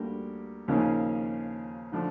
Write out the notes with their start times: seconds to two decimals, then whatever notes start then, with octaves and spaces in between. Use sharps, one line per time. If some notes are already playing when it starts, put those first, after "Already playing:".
Already playing: D2 D3 G3 A#3
0.68 D#2 C#3 F3 A#3 C#4
1.92 D3 F3 A3 D4